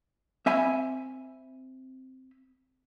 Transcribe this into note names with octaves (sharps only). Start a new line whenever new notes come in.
C4 E5 G#5 B5